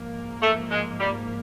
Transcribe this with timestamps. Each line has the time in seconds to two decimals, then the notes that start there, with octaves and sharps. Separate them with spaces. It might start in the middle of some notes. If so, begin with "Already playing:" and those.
Already playing: G#2 F3 A#3
0.41 A3
0.70 G#3
0.99 G3